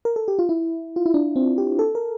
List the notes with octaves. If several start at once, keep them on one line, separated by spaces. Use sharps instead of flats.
A#4
A4
G4
F4
E4
F4
E4
D4
C4
G4
A4
A#4